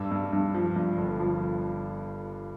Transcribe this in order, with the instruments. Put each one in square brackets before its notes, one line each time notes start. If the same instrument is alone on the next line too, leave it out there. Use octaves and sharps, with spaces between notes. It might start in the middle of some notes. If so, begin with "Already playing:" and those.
Already playing: [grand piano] G2 E6
G2
G2
F3
G2
G1
F3